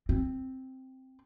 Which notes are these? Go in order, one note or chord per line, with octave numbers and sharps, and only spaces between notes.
C4